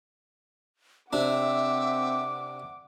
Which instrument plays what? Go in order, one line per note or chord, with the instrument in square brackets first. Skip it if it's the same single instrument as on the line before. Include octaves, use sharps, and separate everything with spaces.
[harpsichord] C3 D4 [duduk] C4 [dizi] E5 [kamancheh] F#5 D6